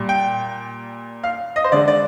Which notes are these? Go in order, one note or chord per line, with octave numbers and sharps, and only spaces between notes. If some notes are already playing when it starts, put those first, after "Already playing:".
Already playing: A#2 G3
G5
F5
D#5
C5
D3 G#3 D5
D5